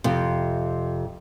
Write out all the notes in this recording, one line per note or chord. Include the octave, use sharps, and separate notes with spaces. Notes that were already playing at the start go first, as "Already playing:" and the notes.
F2 C3